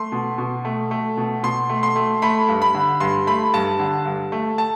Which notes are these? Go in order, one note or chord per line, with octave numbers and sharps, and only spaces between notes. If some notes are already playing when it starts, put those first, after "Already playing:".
Already playing: A3 C6
B2
B2
A3
A3
B2
B2 C6
A3
C6
A3
A3 B5
G2
B5
D3
G2 C6
A3 B5
G2 A5
D3
G2
A3
A5